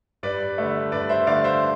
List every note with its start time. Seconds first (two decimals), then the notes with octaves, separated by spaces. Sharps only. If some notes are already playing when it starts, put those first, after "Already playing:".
0.23 G2 B4 D5
0.58 D3 A3
0.92 G2 B4 D5
1.09 C5 E5
1.27 D3 A3 D5 F5
1.44 C5 E5